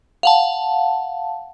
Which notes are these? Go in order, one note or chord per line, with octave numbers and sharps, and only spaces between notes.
F5 F#5 A5